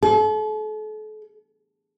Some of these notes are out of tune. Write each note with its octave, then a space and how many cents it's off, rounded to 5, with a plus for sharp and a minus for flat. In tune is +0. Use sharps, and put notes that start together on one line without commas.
A4 -40